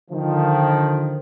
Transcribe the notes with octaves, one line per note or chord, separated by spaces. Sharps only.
D3 D#3 F3